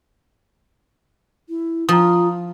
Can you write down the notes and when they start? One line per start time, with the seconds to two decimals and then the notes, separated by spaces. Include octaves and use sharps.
1.49 E4
1.89 F3 F4 A#5 D#6